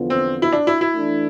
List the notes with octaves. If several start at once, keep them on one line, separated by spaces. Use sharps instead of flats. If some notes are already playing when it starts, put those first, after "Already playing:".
Already playing: E2 D3 F3 B3 F4
C4
E4
D4
E4
E4
E3 A3 D4